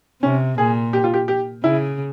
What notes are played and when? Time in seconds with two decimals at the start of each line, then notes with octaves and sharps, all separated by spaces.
0.22 C3 C#4
0.58 A#2 G#4
0.93 G4
1.04 F4
1.14 G4
1.28 G4
1.64 C#3 E4